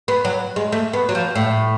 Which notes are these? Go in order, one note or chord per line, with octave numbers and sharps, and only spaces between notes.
B3
F#3
G#3
A3
B3
F#3
F3
A2